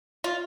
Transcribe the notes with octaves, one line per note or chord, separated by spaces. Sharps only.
F4